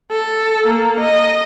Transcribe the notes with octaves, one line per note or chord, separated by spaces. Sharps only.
A4
A#3
D#5